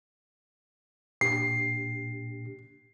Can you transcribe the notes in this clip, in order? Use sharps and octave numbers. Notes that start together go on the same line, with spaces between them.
A#2 D4 G4 C7